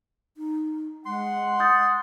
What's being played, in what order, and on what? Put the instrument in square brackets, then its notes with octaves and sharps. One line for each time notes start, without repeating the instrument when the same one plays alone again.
[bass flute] D#4
[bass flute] G#3 [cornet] F#5 [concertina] C6
[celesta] D#6 G6 A6